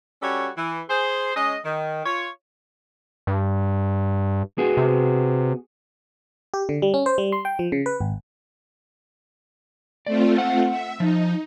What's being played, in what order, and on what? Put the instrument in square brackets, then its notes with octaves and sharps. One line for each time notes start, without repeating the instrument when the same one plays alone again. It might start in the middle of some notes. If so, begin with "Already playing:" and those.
[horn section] G3 C#4 F#4 A4 C#5
E3
G#4 C5
G#3 C#4 D#5
D#3
F4 C#5
[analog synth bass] G2
[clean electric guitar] B3 F#4 G#4
[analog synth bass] C3
[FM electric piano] G4
D3
G3
C#4
C5
G3
C6
G5
F3
C#3
B4
G#1
[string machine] A3 C4 F4 [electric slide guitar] D5
[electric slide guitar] F#5
[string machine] E5
[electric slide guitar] F3 [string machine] D#4